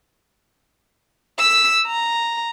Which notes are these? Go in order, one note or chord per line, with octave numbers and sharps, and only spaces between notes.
E6 B6
A#5